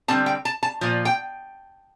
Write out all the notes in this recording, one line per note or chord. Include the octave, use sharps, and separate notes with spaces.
D3 G3 C4 A5
G5
A5
A5
A#2 F3
G5